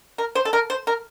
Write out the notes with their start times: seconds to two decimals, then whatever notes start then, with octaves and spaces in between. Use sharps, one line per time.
0.18 A#4
0.35 C5
0.45 A4
0.53 A#4
0.70 C5
0.87 A#4